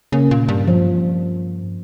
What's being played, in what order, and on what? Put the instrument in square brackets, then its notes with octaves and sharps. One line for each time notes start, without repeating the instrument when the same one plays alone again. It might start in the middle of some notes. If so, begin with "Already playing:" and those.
[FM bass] C#3 [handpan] A#3 C#4
[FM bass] A#2
G2
[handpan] F3